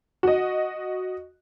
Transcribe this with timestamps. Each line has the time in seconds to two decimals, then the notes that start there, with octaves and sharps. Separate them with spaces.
0.23 F#4 D#5